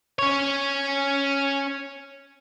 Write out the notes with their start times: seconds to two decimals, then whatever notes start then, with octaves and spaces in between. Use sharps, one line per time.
0.19 C#4 C#5